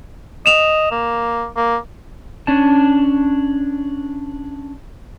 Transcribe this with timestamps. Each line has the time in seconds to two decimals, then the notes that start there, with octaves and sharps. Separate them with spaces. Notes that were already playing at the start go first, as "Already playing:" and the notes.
0.46 D#5 E7 F7
0.91 A#3
1.56 A#3
2.47 C#4 D4 A5